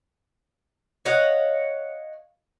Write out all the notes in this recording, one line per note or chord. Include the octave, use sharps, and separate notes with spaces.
C#5 D#5 F5 F#5